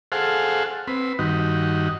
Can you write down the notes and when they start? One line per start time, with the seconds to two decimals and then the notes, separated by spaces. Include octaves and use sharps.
0.12 G#4 A4 C5 F5 F#5
0.87 C4 B4
1.19 G2 D#3 D#4 F#4